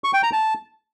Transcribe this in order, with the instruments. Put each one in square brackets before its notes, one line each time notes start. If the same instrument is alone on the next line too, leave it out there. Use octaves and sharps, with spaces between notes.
[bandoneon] C#6
G5
A#5
A5